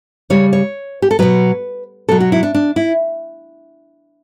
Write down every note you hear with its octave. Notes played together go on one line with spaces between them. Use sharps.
C#3 G3 C#5
C#5
G4
A4
B2 F#3 B4
B2 F#3 A4
F#4
E4
D4
D4
E4